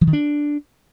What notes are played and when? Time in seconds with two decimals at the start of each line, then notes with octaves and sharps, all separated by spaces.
0.01 F3
0.07 D#3
0.13 D4